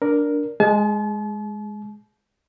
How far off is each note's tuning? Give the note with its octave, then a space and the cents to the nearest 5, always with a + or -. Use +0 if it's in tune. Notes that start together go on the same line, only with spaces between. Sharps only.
D4 -5 A#4 +0
G#3 +0 A5 -45